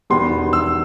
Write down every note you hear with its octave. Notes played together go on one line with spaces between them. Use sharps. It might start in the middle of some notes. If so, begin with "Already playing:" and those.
E1 E2 D#3 G3 B3 C6
E6